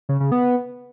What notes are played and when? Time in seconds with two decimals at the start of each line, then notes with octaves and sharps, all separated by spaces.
0.09 C#3
0.20 C#3
0.32 B3